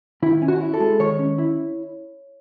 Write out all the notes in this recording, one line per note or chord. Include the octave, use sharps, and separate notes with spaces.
D#3 E4
C#4
F#4
E4
A4
G#3
D#3 C#5
C#4
E4